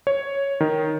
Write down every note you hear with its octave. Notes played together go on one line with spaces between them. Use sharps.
C#5
D#3